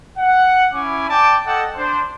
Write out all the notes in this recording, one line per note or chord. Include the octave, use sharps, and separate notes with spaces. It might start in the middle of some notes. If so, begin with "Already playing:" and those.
F#5
C#4 E4 G#5 D6
D5 G5 A5 D6
A4 D#5 F#5 G5 A5
D4 C5